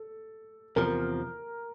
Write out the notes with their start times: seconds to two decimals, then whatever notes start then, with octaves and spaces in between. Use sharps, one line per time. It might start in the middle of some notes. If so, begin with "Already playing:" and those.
Already playing: A4
0.76 E2 C3 F3 A#4